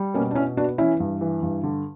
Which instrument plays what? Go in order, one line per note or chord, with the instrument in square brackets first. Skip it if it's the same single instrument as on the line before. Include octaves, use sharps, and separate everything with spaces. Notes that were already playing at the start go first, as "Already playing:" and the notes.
Already playing: [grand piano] G3
[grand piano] B2 [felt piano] A#3 C#4
[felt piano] D4
[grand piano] B2 [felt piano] C#4 E4
[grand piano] B3 [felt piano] D4 F#4
[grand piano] E3 [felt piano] C#4 E4
[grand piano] G2
E3
G2
D3